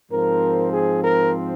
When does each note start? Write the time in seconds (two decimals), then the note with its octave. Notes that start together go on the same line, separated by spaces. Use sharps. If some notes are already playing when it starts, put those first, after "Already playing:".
0.11 G#2 F3 C4 A#4
0.73 G#4
1.04 A#4